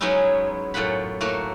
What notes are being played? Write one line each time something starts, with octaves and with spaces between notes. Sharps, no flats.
F#3 G#3 B3 C#4 D#4 E4
F#2 A2 F4 F#5 B5
A2 A3 A#3 F#4